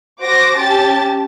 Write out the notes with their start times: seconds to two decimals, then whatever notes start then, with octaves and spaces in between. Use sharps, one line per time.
0.21 F#4 C5 D6 A#6 D7
0.57 C#4 G4 A5 A6